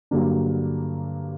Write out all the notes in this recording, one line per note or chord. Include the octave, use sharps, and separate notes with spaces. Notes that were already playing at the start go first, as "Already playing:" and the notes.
G2 D3 F#3 A#3 D4